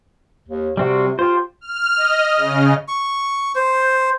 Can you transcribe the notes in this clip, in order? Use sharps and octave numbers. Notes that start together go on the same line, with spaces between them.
D#2
C3 G3 C4 F#4
F4 G4 C5
F6
D#5
C#3
C#6
C5